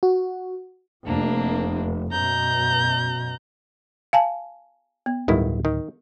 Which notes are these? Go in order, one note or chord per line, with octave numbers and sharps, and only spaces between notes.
F#4
F1 A#3 D4
F#2 B2 A#5 G6
F5 G#5 A5
B3
D1 G1 D#3 E4
D#3